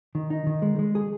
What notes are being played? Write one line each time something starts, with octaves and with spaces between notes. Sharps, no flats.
D#3
D#4
D#3
G#3
G#3
G#4